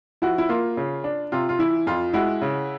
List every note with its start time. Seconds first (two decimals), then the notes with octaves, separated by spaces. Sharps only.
0.22 F3 E4 F#4
0.38 E4
0.49 A#3 F4
0.77 C#3
1.04 D4
1.32 C3 F4
1.49 F4
1.59 E3 E4
1.87 F2 F4
2.13 G#3 E4 F#4
2.42 C#3